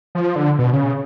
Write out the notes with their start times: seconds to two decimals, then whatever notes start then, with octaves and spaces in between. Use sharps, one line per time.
0.15 F3
0.36 D3
0.59 B2
0.73 C#3